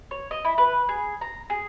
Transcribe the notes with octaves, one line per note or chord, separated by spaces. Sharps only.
C#5
D#5
E4
B4
G#4
A#5
G#4